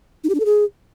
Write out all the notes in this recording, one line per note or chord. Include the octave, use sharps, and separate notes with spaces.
D#4
G4
D4
A4
G#4